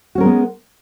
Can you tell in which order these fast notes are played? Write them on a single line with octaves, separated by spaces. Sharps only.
F#4 C#4 A#4 G#3 B3